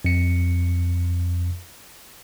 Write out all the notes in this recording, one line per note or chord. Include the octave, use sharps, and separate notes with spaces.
F2 C#7